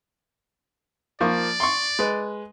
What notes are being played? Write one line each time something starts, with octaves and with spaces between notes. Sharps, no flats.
F3 A#3 D5 C#6
C6 C#6
G#3 B4